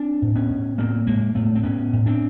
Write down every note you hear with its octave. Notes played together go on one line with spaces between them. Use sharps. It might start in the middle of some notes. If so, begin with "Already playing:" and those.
Already playing: C4 D4
A2
B3 C#4
A2
A2 A#3 C4
A2 G#3 A#3
A2 A3 B3
C4
A2 B3 C#4
A2
C4 D4